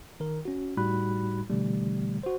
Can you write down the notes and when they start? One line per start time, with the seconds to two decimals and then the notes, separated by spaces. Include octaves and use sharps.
0.20 D#3 A#4
0.45 C#4 F#4
0.77 A2 G3 D#4 F#4 B5 F#6
1.50 B2 D3 E3 G3 A3
2.23 F#4 C5